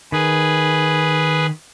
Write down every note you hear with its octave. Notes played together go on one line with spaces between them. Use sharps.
D#3 G#4 B4